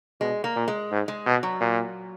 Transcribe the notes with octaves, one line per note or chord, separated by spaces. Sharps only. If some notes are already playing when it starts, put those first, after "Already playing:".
B2 G#3
A#3
A#2
G#3
G#2
G#3
B2
F#3
A#2